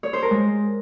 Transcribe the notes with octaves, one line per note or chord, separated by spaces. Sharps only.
C#5
C5
A#4
G#3